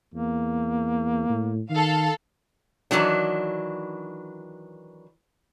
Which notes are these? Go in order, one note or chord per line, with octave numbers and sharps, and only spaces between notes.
E2 A#3
A2
D#3 A4 F5
D#3 E3 F#3 D4